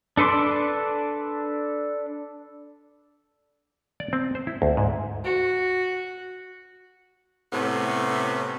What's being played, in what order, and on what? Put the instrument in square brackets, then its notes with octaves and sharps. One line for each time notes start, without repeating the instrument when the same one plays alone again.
[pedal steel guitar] D4 A4 B4 C6 D6
[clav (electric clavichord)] D5
C4
C5
E4
D2
G#2
[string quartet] F#4
[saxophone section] A2 C3 A3 B3 C#4